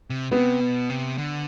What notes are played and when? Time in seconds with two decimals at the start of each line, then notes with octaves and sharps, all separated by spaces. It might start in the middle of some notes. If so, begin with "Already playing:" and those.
0.10 C3
0.32 C3 B3
0.60 B2
0.90 C3
1.18 D3